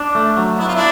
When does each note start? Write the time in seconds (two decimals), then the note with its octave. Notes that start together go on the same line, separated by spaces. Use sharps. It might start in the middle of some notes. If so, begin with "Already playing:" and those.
Already playing: D4
0.15 A3
0.37 F#3
0.59 B3 E4
0.68 F4
0.75 D4 E4